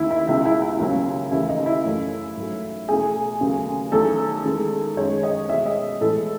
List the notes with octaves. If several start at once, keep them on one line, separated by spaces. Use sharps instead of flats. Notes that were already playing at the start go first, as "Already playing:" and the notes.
Already playing: D#2 D#3 A3 E4
E4
C#2 B2 G#3 E4
E4
E4
D#2 C#3 F#3
D#2 C#3 E3 A3 E4
D#4
E4
F#2 E3 A3
G#2 F#3 A3
E2 B2 A3 G#4
D#2 C#3 F#3 A3
E2 D#3 F#3 A3 A4
E2 D#3 G#3
F#2 D#3 G#3 C#5
D#5
E2 B2 G#3 E5
D#5
A2 E3 G#3 A4